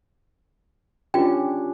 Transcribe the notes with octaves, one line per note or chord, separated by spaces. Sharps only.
C#4 D4 F4 G4 G5